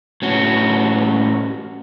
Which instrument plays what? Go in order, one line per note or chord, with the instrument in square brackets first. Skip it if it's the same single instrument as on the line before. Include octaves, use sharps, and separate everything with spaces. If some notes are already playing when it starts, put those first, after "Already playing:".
[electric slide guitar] A2 C#4 F#4